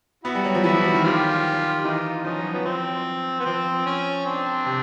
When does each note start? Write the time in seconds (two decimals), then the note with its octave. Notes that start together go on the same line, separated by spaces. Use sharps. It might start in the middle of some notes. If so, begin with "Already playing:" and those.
0.24 B3 E4 F#4
0.35 G3
0.44 F#3
0.55 F3
0.64 E3 E4 F#4
0.74 F3
0.84 F3
0.94 D#3
1.04 F4 G4
1.84 E3 D#4 F4
2.24 F3 C#4 D#4
2.39 F#3
2.52 F3 B3
2.65 F3 C4
3.40 B3
3.45 F3 C4
3.86 C#4
4.26 C4 D4
4.66 C3